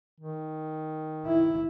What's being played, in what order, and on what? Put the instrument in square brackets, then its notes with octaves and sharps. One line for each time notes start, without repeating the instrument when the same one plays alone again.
[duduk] D#3
[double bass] E4